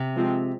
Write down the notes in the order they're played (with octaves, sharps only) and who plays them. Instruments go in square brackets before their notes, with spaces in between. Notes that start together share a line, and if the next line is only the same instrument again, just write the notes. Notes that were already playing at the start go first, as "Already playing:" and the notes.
Already playing: [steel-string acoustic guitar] C3
[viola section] F3 G#3 C4